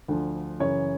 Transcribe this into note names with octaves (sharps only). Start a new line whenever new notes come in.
D2 D3 F3
F#2 C#3 E3 C#5